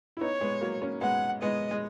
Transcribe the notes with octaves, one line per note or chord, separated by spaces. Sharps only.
E4
B3 D#4 C#5
G#3 B3
F#3 A#3
A#3 C#4
G#3 B3 F#5
G#3 B3 D#5
G#3